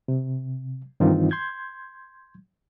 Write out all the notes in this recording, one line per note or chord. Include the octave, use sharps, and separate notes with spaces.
C3
G2 D#3 E3 C4 D#4 F4
C6 G6 G#6